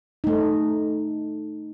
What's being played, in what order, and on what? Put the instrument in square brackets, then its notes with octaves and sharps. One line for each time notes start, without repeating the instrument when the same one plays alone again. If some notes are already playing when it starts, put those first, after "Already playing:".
[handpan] A3 D#4